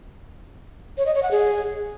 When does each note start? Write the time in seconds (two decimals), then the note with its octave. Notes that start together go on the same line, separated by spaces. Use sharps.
0.98 C#5
1.06 D#5
1.14 C#5
1.23 F#5
1.31 G#4